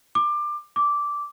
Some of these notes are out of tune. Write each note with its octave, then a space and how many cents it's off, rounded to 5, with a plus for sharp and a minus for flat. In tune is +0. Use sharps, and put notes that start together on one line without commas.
D6 +20
D6 -10